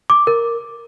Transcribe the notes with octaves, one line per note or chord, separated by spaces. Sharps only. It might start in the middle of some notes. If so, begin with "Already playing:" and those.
D6
A#4